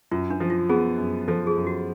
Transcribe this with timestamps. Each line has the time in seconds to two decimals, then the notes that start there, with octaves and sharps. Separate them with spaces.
0.11 F#2 F4
0.30 D4
0.40 F3
0.50 F4
0.69 B3 G#4
0.98 F#2
1.28 F3 A4
1.47 G#4
1.57 F#2
1.67 F#4